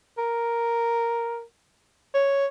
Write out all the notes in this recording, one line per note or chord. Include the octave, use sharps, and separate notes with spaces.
A#4
C#5